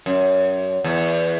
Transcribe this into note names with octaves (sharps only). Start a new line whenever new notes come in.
F#2
E2